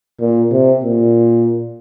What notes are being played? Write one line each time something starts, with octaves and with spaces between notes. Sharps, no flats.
A#2
C3
A#2